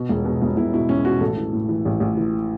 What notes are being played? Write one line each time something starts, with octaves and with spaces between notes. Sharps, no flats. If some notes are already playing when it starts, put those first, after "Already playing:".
Already playing: B2
E1
B2
E1
E1 E4
B2 E4
E1 C#4
B2 F#4
A1 A4
E3
A2
E3
A1
A1
E3